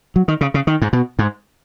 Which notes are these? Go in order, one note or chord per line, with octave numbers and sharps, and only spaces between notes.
F#3
D#3
C#3
C#3
D#3
G#2
B2
G#2